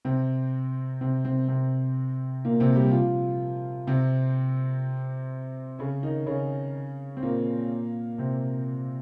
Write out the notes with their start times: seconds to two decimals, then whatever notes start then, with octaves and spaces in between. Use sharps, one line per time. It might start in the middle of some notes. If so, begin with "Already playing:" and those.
0.05 C3 C4
1.01 C3 C4
1.25 C3 C4
1.48 C3 C4
2.45 A#2 A#3
2.60 C3 C4
2.75 G3 G4
2.91 F3 F4
3.87 C3 C4
5.79 C#3 C#4
6.02 D#3 D#4
6.26 C#3 C#4
7.17 C4
7.23 A#2 A#3
8.18 C3 C4